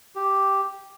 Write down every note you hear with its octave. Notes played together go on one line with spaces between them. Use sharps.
G4